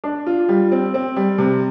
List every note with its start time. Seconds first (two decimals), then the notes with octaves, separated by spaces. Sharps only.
0.04 D4
0.26 F4
0.49 G3
0.72 C4
0.94 C4
1.16 G3
1.38 C3